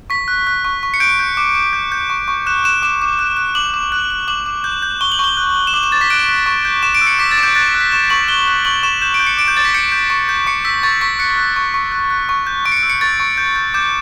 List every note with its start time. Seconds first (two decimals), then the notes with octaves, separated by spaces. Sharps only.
0.10 C#6 B6
0.28 F#6
0.47 F#6
0.65 C#6
0.83 C#6
0.94 C#7
1.00 G6 D7
1.19 G6
1.37 D6
1.55 D6
1.73 G6
1.92 G6
2.10 C#6
2.28 C#6
2.46 F#6 E7
2.64 F#6 E7
2.82 D6 E7
3.02 D6
3.19 F#6
3.37 F#6
3.55 D6 F#7
3.74 D6
3.92 F#6
4.11 F#6
4.28 D6 F#7
4.46 D6
4.64 G6
4.82 G6
5.01 C#6 G7
5.12 F#7
5.19 C#6 G7
5.37 F#6
5.55 F#6
5.67 E7
5.74 D6 F#7
5.84 E7
5.92 D6 A6
6.01 B6
6.10 F#6 D7
6.29 F#6
6.46 C#6
6.65 G6
6.83 C#6 E7
6.95 D7
7.01 E6
7.07 C#7
7.19 D6 B6
7.31 A6
7.38 D6
7.43 G6
7.55 F#6 A6
7.68 B6
7.75 F#6
7.81 B6
7.92 C#6 E7
8.10 C#6 F#7
8.28 F#6 G7
8.47 F#6
8.65 C#6 F#7
8.83 C#6 E7
9.01 G6 E7
9.14 D7
9.20 G6
9.27 C#7
9.37 D6 D7
9.48 G6
9.56 D6 A6
9.65 B6
9.74 G6 C#7
9.92 G6
10.10 C#6
10.29 G6
10.47 C#6 C#7
10.65 E6 B6
10.83 C#6 A6
11.01 C#6 B6
11.19 F#6 C#7
11.38 F#6
11.56 C#6
11.74 C#6
11.92 F#6
12.10 F#6
12.29 C#6
12.47 G6
12.65 C#6 D7
12.72 C#7
12.77 D7
12.83 E6
12.90 C#7
13.01 C#6 A6
13.20 C#6
13.37 G6
13.56 G6
13.74 D6 G6